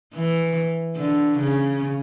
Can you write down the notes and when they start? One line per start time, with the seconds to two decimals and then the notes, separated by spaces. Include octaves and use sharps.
0.14 E3
0.97 D3
1.39 C#3